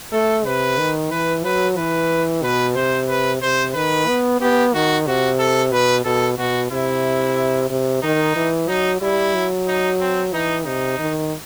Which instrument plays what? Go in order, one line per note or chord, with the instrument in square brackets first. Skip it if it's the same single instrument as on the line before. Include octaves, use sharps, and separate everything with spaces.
[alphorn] A3 [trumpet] A4
[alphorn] C3 [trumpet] B4
[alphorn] D#3
[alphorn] E3 [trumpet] B4
[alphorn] F#3 [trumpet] B4
[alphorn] E3 [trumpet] B4
[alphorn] B2 [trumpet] B4
[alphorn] C3 [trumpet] C5
[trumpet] B4
[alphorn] C3 [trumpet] C5
[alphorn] D#3 [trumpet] B4
[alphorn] B3
[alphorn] B3 [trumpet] G4
[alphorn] D#3 [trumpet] F#4
[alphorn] C3 [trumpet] F#4
[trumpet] A4
[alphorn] B2 [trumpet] B4
[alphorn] B2 [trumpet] A4
[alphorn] B2 [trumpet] F#4
[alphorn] C3 [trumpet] E4
[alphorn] C3
[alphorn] D#3 [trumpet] D#4
[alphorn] E3
[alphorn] F#3 [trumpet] D#4
[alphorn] G3 [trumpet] E4
[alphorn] F#3
[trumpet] D#4
C4
[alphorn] E3 [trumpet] D#4
[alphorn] C3 [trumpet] D#4
[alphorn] D#3